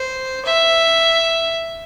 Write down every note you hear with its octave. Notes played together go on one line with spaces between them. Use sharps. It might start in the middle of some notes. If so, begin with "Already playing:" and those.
Already playing: C5
E5